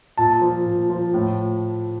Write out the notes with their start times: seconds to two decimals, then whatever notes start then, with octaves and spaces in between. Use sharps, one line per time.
0.17 A#2 A5
0.41 F3
0.66 A#2
0.90 F3
1.14 A2